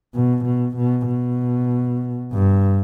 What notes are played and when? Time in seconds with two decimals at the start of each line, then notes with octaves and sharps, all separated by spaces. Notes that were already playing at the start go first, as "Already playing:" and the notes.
0.15 B2
0.45 B2
0.77 B2
1.08 B2
2.33 G2